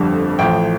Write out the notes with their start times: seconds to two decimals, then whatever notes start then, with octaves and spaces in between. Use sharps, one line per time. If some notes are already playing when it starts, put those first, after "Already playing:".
Already playing: G1 F2 D3 G3 D4
0.39 A1 A2 F3 G5